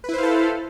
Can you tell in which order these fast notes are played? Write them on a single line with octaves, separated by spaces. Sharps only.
B4 E4 C5 F5 A4